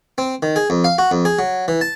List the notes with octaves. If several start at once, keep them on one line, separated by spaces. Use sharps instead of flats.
C4
D#3
G#4
F2
F5
F#4
F2
G#4
F#3
E3
A5